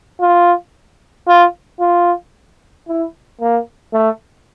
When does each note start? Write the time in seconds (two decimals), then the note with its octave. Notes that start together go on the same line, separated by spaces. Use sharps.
0.20 F4
1.28 F4
1.80 F4
2.88 E4
3.41 A#3
3.93 A3